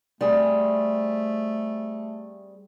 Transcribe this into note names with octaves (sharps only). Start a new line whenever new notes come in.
G3 A3 C4 G#4